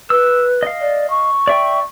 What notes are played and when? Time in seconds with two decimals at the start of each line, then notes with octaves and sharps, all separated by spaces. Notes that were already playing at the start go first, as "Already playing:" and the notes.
0.10 B4 E6
0.63 D#5 F5
0.81 D5
1.10 C#6
1.47 D5 E5 G5